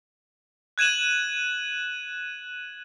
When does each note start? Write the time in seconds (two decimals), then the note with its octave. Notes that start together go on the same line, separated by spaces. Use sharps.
0.78 F#6 G#6 D#7 E7 F#7